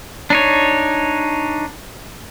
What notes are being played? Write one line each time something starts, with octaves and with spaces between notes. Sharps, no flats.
D4 D#4 C#5